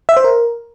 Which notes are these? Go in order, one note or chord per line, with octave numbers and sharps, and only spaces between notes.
E5
C5
A#4